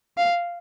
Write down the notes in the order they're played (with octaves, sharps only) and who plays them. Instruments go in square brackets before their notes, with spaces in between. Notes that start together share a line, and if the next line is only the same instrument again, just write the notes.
[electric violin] F5